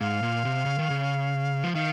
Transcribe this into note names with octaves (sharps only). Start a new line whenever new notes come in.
G#2 F5
A#2
C3
C#3
D#3
C#3
F3
D#3 F5